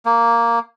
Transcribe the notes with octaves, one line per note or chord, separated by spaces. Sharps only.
A#3